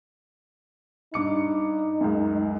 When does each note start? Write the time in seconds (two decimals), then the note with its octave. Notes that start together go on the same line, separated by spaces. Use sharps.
1.14 G2 D#4 D6 C#7
2.01 C#2 F#2